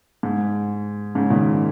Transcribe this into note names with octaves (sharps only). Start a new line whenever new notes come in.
G#2
G#2 C#3
A#2 D#3